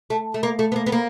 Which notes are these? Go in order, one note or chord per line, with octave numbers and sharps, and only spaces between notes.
A3
A3
A#3
A3
B3
A#3
B3
A#3